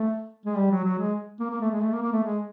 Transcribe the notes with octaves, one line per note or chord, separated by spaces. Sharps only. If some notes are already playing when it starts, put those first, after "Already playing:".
Already playing: A3
G#3
G3
F#3
F#3
G#3
A#3
A#3
A3
G#3
A3
A#3
A#3
A3
G#3